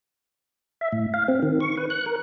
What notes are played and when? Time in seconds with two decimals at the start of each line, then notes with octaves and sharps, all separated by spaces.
0.81 E5
0.92 A2
1.14 F5
1.28 C4
1.42 D#3
1.60 C#6
1.77 B4
1.90 F#6
2.06 A#4